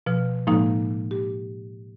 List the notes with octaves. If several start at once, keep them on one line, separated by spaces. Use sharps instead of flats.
B2 F3 F6
A2 F3 G#3 A#3 D#4
G4